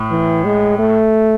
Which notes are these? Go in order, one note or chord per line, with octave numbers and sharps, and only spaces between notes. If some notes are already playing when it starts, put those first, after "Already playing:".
Already playing: A2
E3
G#3
A3